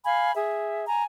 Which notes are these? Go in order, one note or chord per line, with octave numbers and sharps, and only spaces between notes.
F5 G#5 B5
G#4 E5
G#5 A#5